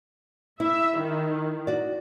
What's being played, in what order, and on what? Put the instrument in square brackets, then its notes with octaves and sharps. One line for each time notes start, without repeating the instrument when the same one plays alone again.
[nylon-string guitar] E4 [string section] E5
[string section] D#3
[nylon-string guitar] F#4 D5